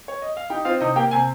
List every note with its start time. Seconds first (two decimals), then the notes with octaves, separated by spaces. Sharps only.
0.08 C#5
0.22 D#5
0.37 F5
0.50 D#4 G4 G5
0.65 C4 F4 F5
0.80 C3 D#4 D#5
0.96 A#3 G4 G5
1.11 C3 G#5